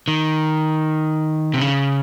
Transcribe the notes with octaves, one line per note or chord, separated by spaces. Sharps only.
D#3
C3
C#3